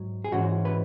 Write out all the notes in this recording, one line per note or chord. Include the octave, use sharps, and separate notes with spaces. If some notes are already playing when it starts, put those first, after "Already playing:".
Already playing: G#2 F#3
G#4
G#2 E3 G#3 C#4 F#4
B4